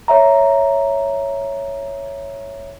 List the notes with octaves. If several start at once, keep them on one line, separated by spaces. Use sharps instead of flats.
C#5 E5 A#5